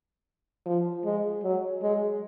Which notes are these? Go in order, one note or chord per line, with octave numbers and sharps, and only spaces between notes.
F3
G#3
F#3
G#3